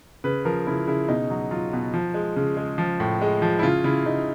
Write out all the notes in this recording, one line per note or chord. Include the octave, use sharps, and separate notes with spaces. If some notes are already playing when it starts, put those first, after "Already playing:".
C#3 B4
F3 A#4
C#3 E4
C#3 E4
B2 D#4
F#3
F#3 F4
B2
F3
G#3
C#3
G#3
F3
A2
G#3
F3
E4
C#3 F4
C#3 E4
C#3 D#4